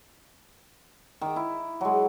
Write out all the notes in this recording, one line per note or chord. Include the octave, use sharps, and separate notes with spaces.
D#3 D6
E4
F#3 G#3